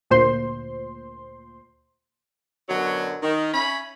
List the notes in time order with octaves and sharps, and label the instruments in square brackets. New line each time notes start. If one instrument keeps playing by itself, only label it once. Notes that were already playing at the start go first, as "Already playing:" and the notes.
[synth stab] D2 A#2 C5 C6
[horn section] F#2 B2 D3 F#3
D#3
C#4 E5 B5